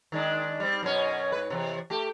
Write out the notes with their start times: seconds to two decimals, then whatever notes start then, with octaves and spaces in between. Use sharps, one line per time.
0.12 D#3 G#3 D4
0.60 G3 C4
0.83 F#2 B2 C#4
1.32 G#2 B4
1.50 E2 C3
1.90 A3 G4